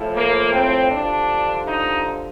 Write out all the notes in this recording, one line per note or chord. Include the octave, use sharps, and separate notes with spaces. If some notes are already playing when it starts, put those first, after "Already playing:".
Already playing: A2 F3
A#3
C4
G2 D3 F3 D4
D#4